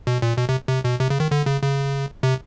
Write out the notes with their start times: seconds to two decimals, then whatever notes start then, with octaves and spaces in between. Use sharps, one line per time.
0.07 B2
0.22 A#2
0.37 B2
0.49 C3
0.69 C3
0.84 B2
1.00 C3
1.10 C#3
1.20 D#3
1.31 D3
1.46 C#3
1.62 C#3
2.23 C3